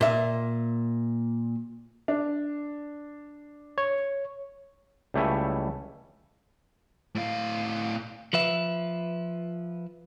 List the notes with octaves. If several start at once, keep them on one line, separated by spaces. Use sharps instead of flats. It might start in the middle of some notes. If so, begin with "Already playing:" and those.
A#2 E5
D4
C#5
C#2 G3 A3 E4 C#5 G#5
A2 F5
F3 B4 E5